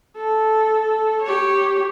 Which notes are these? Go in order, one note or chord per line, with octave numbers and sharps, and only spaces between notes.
A4
G4 C#5